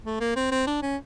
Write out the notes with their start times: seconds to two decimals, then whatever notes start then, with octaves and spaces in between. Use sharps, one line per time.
0.05 A3
0.20 A#3
0.36 C4
0.51 C4
0.67 D4
0.82 C#4